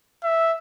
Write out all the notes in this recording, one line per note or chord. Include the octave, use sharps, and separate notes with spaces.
E5